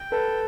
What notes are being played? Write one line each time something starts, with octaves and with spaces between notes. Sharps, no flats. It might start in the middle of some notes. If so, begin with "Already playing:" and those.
Already playing: G5
A4 B4